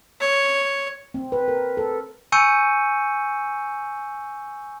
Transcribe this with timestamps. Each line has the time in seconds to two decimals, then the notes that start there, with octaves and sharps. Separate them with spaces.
0.21 C#5
1.14 C4
1.32 B4
1.48 A#4
1.77 A4
2.32 G#5 C#6 E6 G6 C#7 D#7